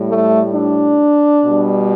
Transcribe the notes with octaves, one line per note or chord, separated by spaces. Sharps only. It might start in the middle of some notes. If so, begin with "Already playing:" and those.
Already playing: A2 G3
A3
D4
B2
G3